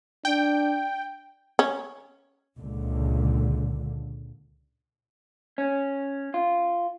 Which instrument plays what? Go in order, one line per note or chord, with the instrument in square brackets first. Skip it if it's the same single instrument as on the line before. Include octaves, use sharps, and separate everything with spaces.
[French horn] D4 [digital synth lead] G5
[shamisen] C#4
[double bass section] C#2 A#2 D3
[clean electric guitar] C#4
F4